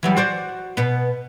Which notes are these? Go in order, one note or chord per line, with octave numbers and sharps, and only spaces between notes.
E3 F#3 G3
F#4 C5 D5
B2 B3